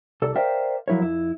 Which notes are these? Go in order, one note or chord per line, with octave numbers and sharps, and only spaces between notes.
C2 A4 D5
A#4 C5 D5 E5 F5 G5
F3 F#3 E4 A#4 C#5
F2 E4